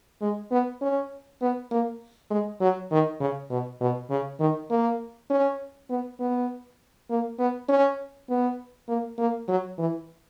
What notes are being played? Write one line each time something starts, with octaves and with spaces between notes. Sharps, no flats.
G#3
B3
C#4
B3
A#3
G#3
F#3
D#3
C#3
B2
B2
C#3
D#3
A#3
C#4
B3
B3
A#3
B3
C#4
B3
A#3
A#3
F#3
E3